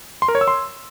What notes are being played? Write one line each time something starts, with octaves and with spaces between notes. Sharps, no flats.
C6
A#4
C#5
E6
C6